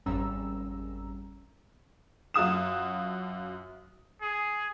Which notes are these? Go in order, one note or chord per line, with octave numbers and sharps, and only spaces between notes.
G#1 F2 G3 C#4 A#5 E6
F#2 F4 F#4 D#6 E7
G#4